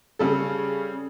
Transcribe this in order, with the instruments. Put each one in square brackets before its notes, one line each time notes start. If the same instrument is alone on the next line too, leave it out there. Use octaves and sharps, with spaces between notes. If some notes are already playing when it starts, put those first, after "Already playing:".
[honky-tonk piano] C#3 G3 A4